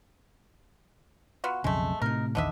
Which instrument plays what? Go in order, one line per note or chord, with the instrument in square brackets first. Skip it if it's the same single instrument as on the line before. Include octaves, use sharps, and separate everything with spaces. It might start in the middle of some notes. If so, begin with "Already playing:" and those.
[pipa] B3 F4 F#4
[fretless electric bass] B1 F2 C#3 [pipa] G#3 A3
[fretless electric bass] A2 C3 [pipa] D#4 A#4
[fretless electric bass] A#1 E2 D#3 [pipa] D3 D#5 E5